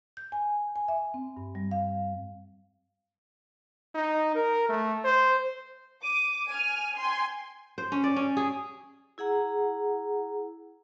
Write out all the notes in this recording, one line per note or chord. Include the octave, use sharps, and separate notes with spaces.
G6
G#5
G#5
E5
C4
G2
G3
F5
D#4
A#4
A3
C5
D6 D#7
G#5 F6
G5 G#5 C6
C5
C#4
D5
C#4
G#4
E4 G#4 F#5 A#5